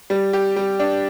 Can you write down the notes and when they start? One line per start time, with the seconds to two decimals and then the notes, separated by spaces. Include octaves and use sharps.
0.10 G3
0.33 G4
0.56 G3
0.80 D4